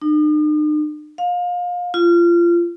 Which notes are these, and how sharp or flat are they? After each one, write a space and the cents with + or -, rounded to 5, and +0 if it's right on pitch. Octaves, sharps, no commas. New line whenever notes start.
D#4 -45
F5 +30
F4 -25